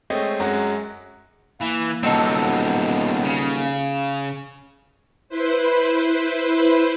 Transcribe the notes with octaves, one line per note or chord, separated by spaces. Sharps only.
G#3 A3 C4 C#5 D#5
F#2 F#3 G#3 F#4
E3 A#3
D#1 B2 F#3 C4 D#4 A4
C#3
E4 B4 C5